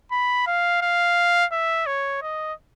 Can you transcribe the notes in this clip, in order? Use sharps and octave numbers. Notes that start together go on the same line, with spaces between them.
B5
F5
F5
E5
C#5
D#5